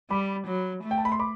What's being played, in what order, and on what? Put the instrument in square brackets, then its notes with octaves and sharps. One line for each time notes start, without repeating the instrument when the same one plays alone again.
[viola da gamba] G3 [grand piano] B5 D6
[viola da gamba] F#3
A3
[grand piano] G5
A5
B5
C6
B5 D6